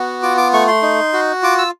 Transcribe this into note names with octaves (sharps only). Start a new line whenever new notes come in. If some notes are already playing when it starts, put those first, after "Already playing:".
Already playing: B3 F#4
F4 D6
D6
A3 C#6
C6
D#4
F#4
F4 D6
E6